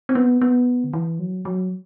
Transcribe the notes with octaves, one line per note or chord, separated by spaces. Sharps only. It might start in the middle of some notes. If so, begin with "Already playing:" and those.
C4
B3
B3
D3
E3
F#3
F#3